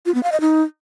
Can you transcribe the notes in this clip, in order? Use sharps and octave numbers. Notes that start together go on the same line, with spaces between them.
F4
B3
F5
D#5
D#4